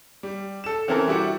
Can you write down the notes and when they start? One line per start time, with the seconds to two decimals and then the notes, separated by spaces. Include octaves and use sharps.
0.23 G3
0.64 A4 E7
0.88 C#3 E3 C4 E4 A4 A#4
1.08 G3 D4 E4 F#4 G4